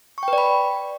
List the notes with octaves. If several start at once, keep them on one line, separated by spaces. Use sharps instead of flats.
C#6
G5
B4
D5
B5